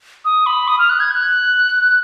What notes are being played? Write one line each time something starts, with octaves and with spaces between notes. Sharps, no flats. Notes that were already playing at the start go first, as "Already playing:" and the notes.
D#6
B5
D#6
F6
F#6
G#6
F#6